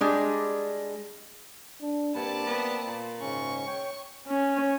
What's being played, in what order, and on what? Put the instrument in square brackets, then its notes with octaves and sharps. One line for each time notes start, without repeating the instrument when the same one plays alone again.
[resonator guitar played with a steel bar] G3 G#3 D4
[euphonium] D4
[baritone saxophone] G2 [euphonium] A#3 [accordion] C4 B5 [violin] D5 A5
[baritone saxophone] B3
A#2
[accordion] G#2 C#3 C#4 [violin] C#6
[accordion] C#5 G5
[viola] C#4